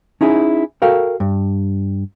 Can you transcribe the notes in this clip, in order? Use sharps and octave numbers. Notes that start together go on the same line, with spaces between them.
C#4 D#4 E4 G#4
F#4 A4 A#4 F5 G5
G2